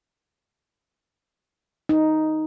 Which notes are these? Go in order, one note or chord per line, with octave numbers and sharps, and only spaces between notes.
D#4